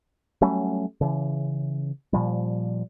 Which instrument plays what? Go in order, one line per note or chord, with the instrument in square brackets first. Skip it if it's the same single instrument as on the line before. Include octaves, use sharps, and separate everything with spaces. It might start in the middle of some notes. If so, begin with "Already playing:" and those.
[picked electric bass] F#3 G3 A3 C#4
C#3 E3
A#2 F3 G3